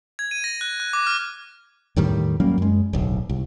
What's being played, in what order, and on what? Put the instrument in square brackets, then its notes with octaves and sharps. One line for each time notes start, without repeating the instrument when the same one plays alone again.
[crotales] G#6
D#7
A#6
F#6
F#6
D6
F6
[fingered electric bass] E2 A2 D#3 G3
F#3 G3 A#3 C#4
F#2 G#3
D1 B1
C2